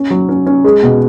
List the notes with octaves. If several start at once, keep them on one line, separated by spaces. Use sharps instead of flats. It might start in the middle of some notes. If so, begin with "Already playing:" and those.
Already playing: C#4
F#3
C#4
C#4
G#3
B2